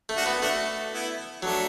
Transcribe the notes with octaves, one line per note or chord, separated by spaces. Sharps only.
A3
D4 F#4
B3
A3 D4 F#4
B3 E4
F#3 A3 D4